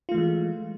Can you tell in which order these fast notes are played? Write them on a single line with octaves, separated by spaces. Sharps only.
F4 A3 E3 G#3